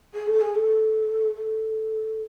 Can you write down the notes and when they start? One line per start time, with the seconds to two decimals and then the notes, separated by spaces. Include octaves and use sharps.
0.14 G#4
0.27 A4
0.41 G#4
0.55 A4
1.35 A4